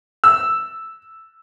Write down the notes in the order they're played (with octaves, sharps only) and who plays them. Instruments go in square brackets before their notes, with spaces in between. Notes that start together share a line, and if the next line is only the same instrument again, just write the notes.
[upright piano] E6